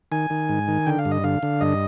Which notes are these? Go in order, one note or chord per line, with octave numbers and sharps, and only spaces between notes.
D#3 G#5
D#3
G#2
D#3
D3 G5
F5
G2
D#5
D3 F5
D3
G2 D#5